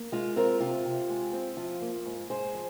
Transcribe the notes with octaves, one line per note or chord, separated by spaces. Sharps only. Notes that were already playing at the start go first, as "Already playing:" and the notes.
Already playing: A#3
G#3 F4
C4 F4 A#4
C3 F4
C3
G#3
C4
F3 F4
A#3
G#2
G#2 G#4 C5
F3